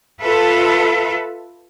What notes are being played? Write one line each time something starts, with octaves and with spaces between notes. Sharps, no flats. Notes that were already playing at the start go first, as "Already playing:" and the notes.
F4 A4 B4 E5